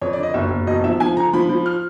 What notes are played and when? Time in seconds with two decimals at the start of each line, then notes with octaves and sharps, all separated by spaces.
0.02 F2 C#5
0.13 D5
0.18 D3
0.23 D#5
0.34 F#1 E5
0.50 F#1
0.67 E1 D#5
0.84 F3 E5
1.00 F3 G#5
1.16 D3 A#5
1.33 F3 B5
1.49 F3
1.66 F6